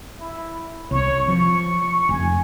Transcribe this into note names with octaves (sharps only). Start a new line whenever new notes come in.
E4
C2 C#5
F3 C#6
F1 G#5